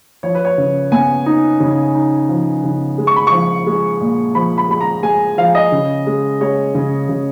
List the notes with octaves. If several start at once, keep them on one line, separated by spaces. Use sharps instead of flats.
F3 C#5
B4
C#5
C#3
B3 G#5
D#4
C#3
D#4
F3
C#3
G#3
C#6
B5
F3 C#6
G#3
A#2
F3 B5
B5
G#3 B5
A#5
G#3 G#5
F3 F5
D#5
C#3
G#3
G#3 C#5
C#3
C#3